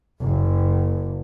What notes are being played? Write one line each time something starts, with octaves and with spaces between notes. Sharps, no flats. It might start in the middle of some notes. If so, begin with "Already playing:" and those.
F#1